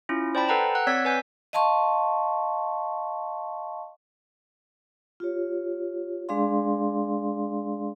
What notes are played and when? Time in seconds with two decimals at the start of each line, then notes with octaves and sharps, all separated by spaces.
0.09 C#4 E4 F4
0.35 C5 D5 G5 A5 B5
0.49 A4 B4 F#5 G5 A#5
0.75 F#5 F#6
0.87 C4 C#5 D5 E6 G#6 B6
1.05 B4 G#5 G6 B6
1.53 D#5 F5 A5 C6 C#6
5.20 F4 G4 C#5
6.29 G#3 D4 G#4 D5 F5 C6